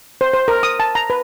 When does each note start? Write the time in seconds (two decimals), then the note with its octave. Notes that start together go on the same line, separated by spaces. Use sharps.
0.21 C5
0.34 C5
0.48 A#4
0.63 D#6
0.80 A5
0.95 A#5
1.10 B4